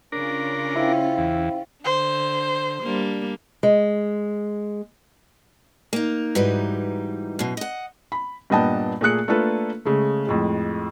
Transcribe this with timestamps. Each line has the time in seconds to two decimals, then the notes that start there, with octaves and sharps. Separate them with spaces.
0.12 C#3 C#4 D4 F4 A#4
0.76 E4 C5 F5 G5
1.18 E2
1.84 D3 C5
2.83 G3 A#3 D4
3.63 G#3
5.93 A#3 D#4
6.35 G#2 E3 G3 D#4 F#4 B4
7.39 F#2 B2
7.57 D#5 F#5
8.12 B5
8.50 G2 A#2 B3 D#5 G5 A5
9.01 A#2 A3 G#4 F#6 C#7
9.28 A3 A#3 D4 F4 A4 B4
9.85 C#3 G#3 A3
10.27 F2 A2 G#3